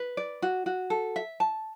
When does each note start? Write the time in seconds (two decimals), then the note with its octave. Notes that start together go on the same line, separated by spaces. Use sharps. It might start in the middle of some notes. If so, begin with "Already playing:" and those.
Already playing: B4
0.17 D5
0.42 F#4
0.66 F#4
0.90 A4
1.16 E5
1.40 A5